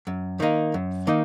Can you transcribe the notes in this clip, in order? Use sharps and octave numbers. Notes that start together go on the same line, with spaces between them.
F#2
D#3 A#3 D#4
F#2
D#3 A#3 D#4